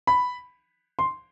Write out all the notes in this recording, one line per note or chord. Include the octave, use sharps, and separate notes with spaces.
B5
C6